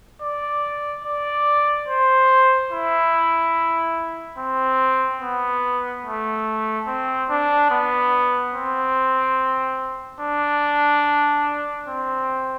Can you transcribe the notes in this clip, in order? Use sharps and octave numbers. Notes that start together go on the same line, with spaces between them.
D5
D5
C5
E4
C4
B3
A3
C4
D4
B3
C4
D4
C4